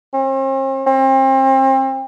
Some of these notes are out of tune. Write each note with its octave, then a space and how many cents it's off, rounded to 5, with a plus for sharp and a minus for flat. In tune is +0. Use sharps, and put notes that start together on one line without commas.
C4 +45
C4 +35